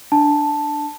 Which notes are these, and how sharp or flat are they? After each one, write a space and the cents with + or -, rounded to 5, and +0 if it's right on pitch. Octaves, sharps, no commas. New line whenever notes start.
D4 +0 A5 +0